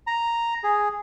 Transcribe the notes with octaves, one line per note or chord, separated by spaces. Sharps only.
A#5
G#4